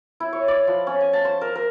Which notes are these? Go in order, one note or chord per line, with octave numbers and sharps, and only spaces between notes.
E4
C#5
D5
F3
C#4
G#5
A5
C5
A#4
A#4